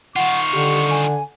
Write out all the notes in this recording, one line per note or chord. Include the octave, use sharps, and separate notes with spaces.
D#3 F4 F#5 C#6
D3 G4
G#5